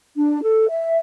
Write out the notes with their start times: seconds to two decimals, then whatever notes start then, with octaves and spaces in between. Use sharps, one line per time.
0.16 D4
0.43 A4
0.69 E5